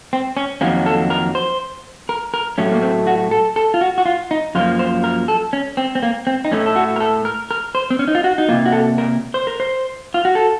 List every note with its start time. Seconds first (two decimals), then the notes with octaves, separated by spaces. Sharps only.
0.13 C4
0.37 C#4
0.61 F2 D#3 F#3 A#3 C#4
0.86 A4
1.10 A#4
1.35 C5
2.09 A#4
2.34 A#4
2.58 A2 F#3 A3 C#4
2.72 A#3
2.82 C4
3.07 F#4
3.31 A4
3.56 A4
3.74 F4
3.81 F#4
3.98 F#4
4.06 F4
4.31 D#4
4.55 F#2 F3 A#3 F4
4.79 C5
5.04 A#4
5.28 A4
5.53 C#4
5.77 C4
5.95 C4
6.03 A#3
6.27 C4
6.45 D#4
6.52 A2 A3 C#4
6.66 A4
6.76 F#4
6.96 A#4
7.00 A4
7.25 A#4
7.51 A#4
7.75 C5
7.90 C4
7.99 C#4
8.08 D#4
8.15 F4
8.24 F#4
8.38 D#4
8.48 C3 D#3 A#3 F4
8.66 F#4
8.72 A4
8.98 A#4
9.34 C5
9.47 A#4
9.60 C5
10.14 F4
10.25 F#4
10.35 A4